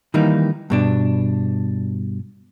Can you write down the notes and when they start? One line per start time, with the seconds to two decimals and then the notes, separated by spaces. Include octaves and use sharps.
0.14 D#3 E3 G3 A#3 D#4
0.70 G2 B2 D4